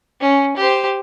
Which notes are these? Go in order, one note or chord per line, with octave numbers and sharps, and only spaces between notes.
C#4
G4 C5